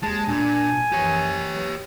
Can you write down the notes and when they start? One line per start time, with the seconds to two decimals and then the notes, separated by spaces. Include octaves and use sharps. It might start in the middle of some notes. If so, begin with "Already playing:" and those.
0.03 D#2 G#3 A5
0.28 A#2 D4 G#5
0.92 F#2 E3 F3 G4 C#5
1.52 E3 F#3